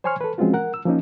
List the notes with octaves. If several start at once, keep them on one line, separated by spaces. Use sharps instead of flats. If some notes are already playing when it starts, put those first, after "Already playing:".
C5 C#5 G#5 C6 C#6 F6
A4 B4
F3 G#3 C4 C#4 F4 F#4
A#4 F#5
E6
F3 A#3 C#4 D#4